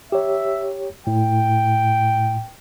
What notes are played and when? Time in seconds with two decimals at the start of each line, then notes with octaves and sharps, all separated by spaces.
0.12 G4 C#5 E5
1.07 A2 G5